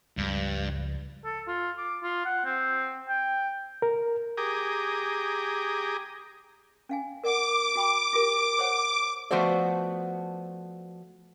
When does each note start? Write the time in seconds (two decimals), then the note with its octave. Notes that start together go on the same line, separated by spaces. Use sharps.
0.17 C#2 G2 F3 G#3
1.25 A4
1.47 F4
1.78 D6
2.03 F4
2.25 F#5
2.45 C4
3.09 G5
3.82 A#4
4.37 G4 G#4 A#5 D6 D#6
6.89 C#4 F5 G#5
7.24 A#4 D5 F#5 D6
7.76 F#4 G5 B5
8.13 F4 G4 A#4
8.59 C5 C#5 F#5
9.31 F3 A3 B3 F#4 C5 D5